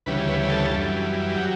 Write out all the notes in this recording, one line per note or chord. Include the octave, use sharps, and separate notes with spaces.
D2 C#3 E3 G3 B4
B4
A4
F#2 E3 G3
F#3 G4